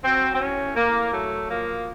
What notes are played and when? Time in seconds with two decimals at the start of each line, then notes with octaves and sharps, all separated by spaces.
0.04 F#3 C4
0.34 C4
0.40 A2 C#4
0.76 A2 A#3
1.11 F#3 A3
1.48 F3 A#3